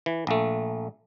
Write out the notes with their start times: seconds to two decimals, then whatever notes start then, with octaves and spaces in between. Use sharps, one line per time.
0.06 E3
0.27 A#1 A3